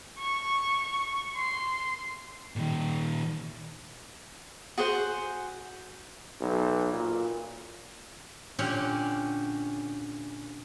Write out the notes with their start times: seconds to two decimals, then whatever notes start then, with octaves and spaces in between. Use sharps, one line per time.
0.19 C#6
1.36 C6
2.56 A#2 D#3
4.78 F#4 G#4 C5 F#5
6.41 B1
6.93 A#2
8.59 A#2 D3 C#4 G4 F#5